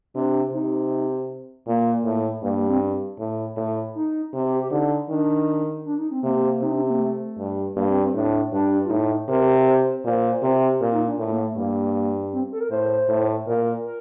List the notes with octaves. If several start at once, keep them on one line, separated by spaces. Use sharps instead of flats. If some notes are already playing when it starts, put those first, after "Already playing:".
C3 D4
C3 D#4
A#2 A#3
A2
G2 A#3
A#3
C4
A2
A2
D#4
C3
G4
G4
D3 D#4
D#3 D4
D4
D#4
C4
C3 A#3
C3 D#4
D4
C4
A#3
A3
G2
G2 A#3
C4
C4
A2 D4
G2 D4
F4
A2 D#4
C3 A#4
C5
A#2 C5
C3
A#2 A#4
D#4
D4
A2 A3
A#3
A3
G2 A#3
C4
A4
A#4
A2 C5
A2
A#2 A#4
A#4